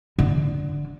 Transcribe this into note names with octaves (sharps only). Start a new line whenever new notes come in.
D3